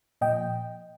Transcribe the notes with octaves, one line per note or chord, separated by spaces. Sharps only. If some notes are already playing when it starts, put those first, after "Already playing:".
A#2 F3 D#5 G5